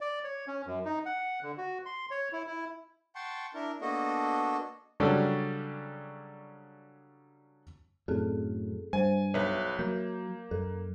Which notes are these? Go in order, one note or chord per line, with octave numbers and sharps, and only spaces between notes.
D5
C#5
C#4
F#2
D#4
F#5
D3
F#4
C6
C#5
E4
E4
F#5 G5 A5 C6 C#6
D4 E4 A#4
A#3 B3 D4 F#4 A4 D#5
C#3 F#3 G3 C#4 D4 A4
F#2 A2 C4 G#4 A4
G2 G3 C5 G#5
B1 B4 C#5 E5
F#3 A#3 G6
F#2 A4